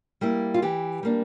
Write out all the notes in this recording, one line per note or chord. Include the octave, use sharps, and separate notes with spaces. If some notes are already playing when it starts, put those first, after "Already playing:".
G3 A#3 E4
F4
E3 G4
G3 A#3 D4